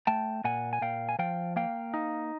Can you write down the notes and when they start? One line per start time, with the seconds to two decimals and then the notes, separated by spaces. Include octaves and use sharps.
0.07 A3 G5 A5
0.44 A#2 F#5 G#5
0.73 G#5
0.81 A#2 F5 G5
1.09 G#5
1.19 F3 F5 G5
1.56 A#3 F5 G5
1.94 D#4